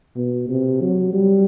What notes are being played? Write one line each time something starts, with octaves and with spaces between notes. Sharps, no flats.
B2
C3
F#3
G3